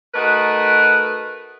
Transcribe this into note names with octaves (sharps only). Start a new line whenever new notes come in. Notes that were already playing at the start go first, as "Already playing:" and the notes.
A3 D#4 F#4 A#4 B4